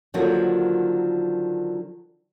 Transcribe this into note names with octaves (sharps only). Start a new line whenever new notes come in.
D3 D#3 F3 F#3 A#3 F#4